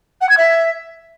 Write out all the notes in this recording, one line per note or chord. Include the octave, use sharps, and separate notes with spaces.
F#5
G#6
E5